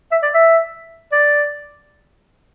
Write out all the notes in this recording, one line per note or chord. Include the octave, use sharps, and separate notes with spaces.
E5
D5
E5
D5